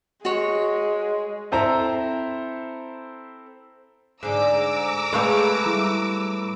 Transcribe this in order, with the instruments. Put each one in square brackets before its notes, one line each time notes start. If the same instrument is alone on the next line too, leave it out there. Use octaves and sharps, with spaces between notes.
[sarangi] G#3 [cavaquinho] F#4 C#5
[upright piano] C4 E4 A4 C5 E5 A#5
[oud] G#2 D3 [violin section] A#5 D6 E6
[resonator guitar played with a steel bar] A2 A3 F5 [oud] G#3 [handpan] A4 B4
[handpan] G3 E4